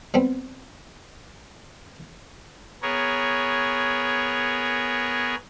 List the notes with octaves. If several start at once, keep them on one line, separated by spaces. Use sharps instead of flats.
G3 B3 C4
B3 G#4 A#4 C#5